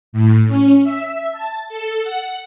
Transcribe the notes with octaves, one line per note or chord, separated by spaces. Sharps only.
A2
C#4
E5
A5
A4
F#5